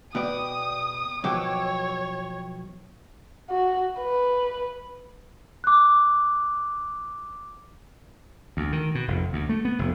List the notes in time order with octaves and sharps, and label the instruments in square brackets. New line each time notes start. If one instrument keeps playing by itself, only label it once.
[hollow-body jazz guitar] B2 B3 D5 [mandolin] G5 [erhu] D#6
[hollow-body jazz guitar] B2 F3 F#3 [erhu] C#5 [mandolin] G5 D6 E6
[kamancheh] F#4
B4
[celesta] D6 F#6
[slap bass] D2
D#3
B2
F1
D2
A3
B3
F1